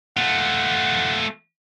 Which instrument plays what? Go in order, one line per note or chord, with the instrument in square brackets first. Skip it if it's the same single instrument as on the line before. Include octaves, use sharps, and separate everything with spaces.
[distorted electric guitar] A3 F4 [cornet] F#5